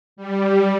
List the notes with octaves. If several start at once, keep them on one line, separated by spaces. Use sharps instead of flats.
G3